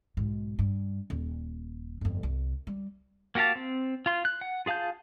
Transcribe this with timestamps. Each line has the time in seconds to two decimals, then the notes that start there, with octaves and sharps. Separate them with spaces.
0.17 B1 G#2
0.59 G2
1.10 D#1
2.01 G1 F2
2.23 C2
2.67 G3
3.35 A#3 F#4 G4 F5 A5
3.55 C4
4.06 F4 C6
4.25 F#6
4.41 F#5
4.66 F4 G#4 F5 A5 G6